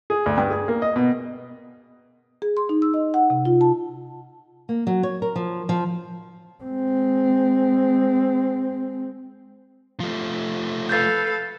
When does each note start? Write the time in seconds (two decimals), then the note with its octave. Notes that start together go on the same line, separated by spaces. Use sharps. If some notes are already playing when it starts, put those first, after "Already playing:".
0.10 G#4
0.26 D2
0.37 G2
0.50 G#4
0.68 A#3
0.82 D#5
0.96 B2
2.42 G#4
2.57 C6
2.69 D#4
2.82 E6
2.94 D#5
3.14 F#5
3.30 C3
3.45 F4
3.61 A5
4.69 A#3
4.87 F#3
5.03 C#5
5.22 A#4
5.36 F3
5.69 F3
6.63 G#3 C4
10.00 F3 A3
10.89 A4 B4 F5 G6 A6